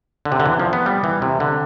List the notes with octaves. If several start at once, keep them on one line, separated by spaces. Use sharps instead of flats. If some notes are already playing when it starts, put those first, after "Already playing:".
D3
C3
D3
E3
F3
B3
G3
E3
C3
D3